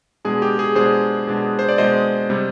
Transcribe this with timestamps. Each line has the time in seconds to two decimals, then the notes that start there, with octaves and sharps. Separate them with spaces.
0.25 B2 G#3 D4 G#4
0.42 G4
0.59 G#4
0.75 B2 G#3 D4 G#4 C5
1.27 B2 G#3 D4
1.59 C5
1.69 D5
1.78 B2 G#3 D4 C5 D#5
2.30 C3 G3